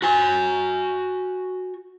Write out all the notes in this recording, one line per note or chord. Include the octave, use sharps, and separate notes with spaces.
F#4 G#5